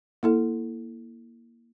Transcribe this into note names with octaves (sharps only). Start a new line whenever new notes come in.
A#3 E4 A4